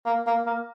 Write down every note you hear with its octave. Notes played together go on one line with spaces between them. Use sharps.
A#3
A#3
A#3